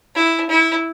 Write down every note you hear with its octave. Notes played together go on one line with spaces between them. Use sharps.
E4
E4